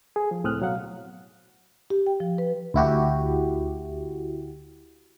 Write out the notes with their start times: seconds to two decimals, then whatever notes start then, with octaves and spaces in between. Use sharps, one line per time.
0.16 G#4
0.31 F3
0.44 C#2 A2 C4 D#6 F6 F#6
0.61 B2 F#3 F5 F#5
1.90 G4
2.07 G5
2.20 F3
2.38 B4
2.74 D2 E4 F#4 G4